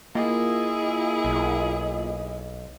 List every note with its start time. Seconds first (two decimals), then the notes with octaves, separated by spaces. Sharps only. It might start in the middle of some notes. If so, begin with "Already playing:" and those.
0.15 A#3 E4 F4 G#4 D#5
1.25 B1